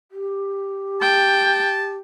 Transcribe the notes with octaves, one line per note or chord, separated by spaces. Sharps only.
G4
G5 A5